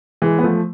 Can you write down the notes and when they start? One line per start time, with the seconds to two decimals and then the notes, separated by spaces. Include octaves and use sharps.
0.22 E3 G#3
0.39 B3
0.44 F3 A3